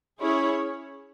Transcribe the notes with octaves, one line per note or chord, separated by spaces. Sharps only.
C#4 E4 G#4 C#5